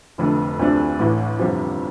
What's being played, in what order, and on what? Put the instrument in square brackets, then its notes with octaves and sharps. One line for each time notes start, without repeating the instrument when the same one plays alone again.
[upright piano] F1 F2 D3 A3
D2 C3 F3 A3 D4
A1 A2 E3
G1 F2 C3 F3